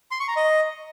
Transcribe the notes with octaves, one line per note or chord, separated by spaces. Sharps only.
C6
C#6
A#5
D#5